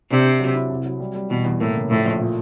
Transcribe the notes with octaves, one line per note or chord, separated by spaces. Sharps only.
C3 D4
D4
F#3
E4
C2
F#3
G3
G3
E2 B2
E2
A2 A#3
C#3
A#1 A2
A#1
A#2